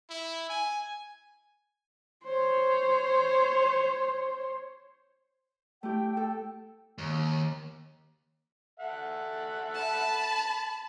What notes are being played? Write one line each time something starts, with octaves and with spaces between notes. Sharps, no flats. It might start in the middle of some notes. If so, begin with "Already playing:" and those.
E4
G#5
C5 C#5
A3 E4 G4 G5
A4
D#2
A4 E5 F#5
A5 B5